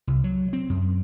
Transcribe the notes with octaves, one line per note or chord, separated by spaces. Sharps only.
C2
F#3
C4
F#2